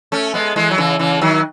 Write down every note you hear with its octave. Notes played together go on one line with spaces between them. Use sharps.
A3 C#4
G#3 B3
E3 G#3
F#3
C#3 E3
C#3 E3
D#3 F#3